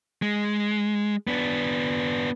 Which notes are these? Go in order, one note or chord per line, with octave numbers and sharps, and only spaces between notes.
G#3
B3 D4